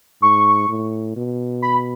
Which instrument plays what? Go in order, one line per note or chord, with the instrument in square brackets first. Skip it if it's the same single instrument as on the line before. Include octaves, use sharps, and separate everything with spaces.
[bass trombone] G#2 [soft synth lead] C#6
[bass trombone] A2
B2
[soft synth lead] B5